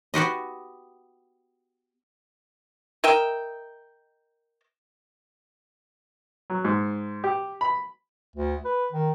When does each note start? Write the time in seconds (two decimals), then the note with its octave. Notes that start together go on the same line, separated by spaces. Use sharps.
0.14 B3 F#4 G4 D#5
3.04 A#4 D#5 E5 G5
6.50 F#3
6.65 G#2
7.24 G4
7.61 B5
8.36 D2
8.65 B4
8.92 D#3